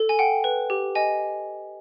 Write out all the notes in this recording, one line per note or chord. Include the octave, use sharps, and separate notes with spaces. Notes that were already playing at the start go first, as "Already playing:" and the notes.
Already playing: A4
G#5
F#5 G5
B4
G4
D#5 G#5